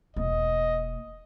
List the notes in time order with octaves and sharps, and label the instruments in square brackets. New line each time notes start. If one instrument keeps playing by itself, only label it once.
[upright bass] E1 A#3 [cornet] D#5